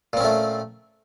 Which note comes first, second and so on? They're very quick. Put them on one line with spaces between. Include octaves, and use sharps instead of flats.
A#2 C4 C#4 A3